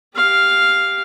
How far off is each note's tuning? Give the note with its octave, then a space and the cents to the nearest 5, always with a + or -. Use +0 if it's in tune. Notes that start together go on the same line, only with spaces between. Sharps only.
G4 +0 F5 +0